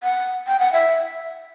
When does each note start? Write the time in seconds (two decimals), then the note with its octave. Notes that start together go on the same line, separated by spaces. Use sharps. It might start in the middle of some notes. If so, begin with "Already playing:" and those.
0.03 F#5
0.47 G5
0.59 F#5
0.73 E5